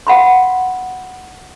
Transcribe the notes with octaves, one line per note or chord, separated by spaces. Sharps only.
F5 F#5 B5 C6